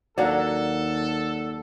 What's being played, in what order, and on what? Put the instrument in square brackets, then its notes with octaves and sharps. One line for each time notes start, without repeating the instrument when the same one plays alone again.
[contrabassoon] D#2 [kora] F#3 A#3 D4 [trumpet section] A4 [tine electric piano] D5 F#5